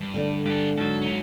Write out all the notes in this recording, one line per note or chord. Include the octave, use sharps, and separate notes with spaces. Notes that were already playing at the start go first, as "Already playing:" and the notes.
G2
D3 A3 D4
G2 G4 A4
G#2 F#3 A4
C#4 D#4